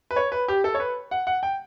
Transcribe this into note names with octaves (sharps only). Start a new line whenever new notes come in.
B4
C#5
B4
G4
A4
C#5
B4
F#5
F#5
G5